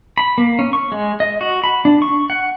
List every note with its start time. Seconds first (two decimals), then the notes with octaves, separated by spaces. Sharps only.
0.18 B5
0.38 A#3
0.59 C#4
0.73 C#6
0.92 G#3
1.20 D#5
1.41 F#4
1.64 B5
1.85 D4
2.02 C#6
2.30 F#5